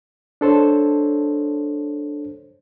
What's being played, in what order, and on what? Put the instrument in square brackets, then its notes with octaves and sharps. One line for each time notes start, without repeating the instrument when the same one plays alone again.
[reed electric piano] D4 A4 C5 C#5